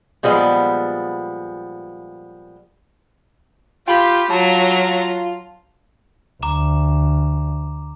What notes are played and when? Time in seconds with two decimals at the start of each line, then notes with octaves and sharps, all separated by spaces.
0.23 A#2 F3 G3 G#3 B3
3.88 F4 G4 G5 B5
4.30 F#3 F4 A5 A#5
6.42 D2 A#5 D6 E7